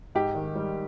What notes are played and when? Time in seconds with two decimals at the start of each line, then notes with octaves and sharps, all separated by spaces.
0.15 G#2 G4
0.35 D#3
0.55 G3